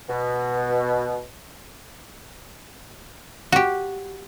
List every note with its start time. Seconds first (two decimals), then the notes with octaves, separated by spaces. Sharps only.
0.09 B2
3.52 F#4 G4